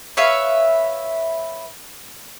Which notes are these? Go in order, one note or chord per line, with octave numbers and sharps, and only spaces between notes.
B4 C#5 E5 F5